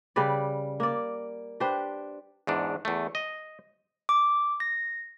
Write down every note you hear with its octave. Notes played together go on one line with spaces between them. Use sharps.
C#3 G3 B4 D5
A#3 D5
D4 G4 B4 C5
E2 G#2 D4
E2 A3
D#5
D6
A#6